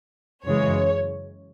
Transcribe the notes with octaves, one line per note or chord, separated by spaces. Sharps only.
F#2 C#3 E3 G#3 C#5